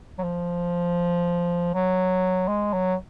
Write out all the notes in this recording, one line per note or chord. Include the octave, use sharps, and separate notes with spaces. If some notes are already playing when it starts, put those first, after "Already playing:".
F#3
F3
F#3
G#3
F#3